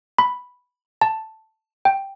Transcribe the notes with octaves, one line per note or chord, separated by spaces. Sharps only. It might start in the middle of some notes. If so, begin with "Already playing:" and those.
B5
A5
G5